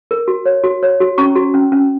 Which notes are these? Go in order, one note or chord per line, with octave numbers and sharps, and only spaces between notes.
A#4
F#4
C#5
F#4
C#5
F#4
C#4 A#5 C#6
F#4
C#4
C#4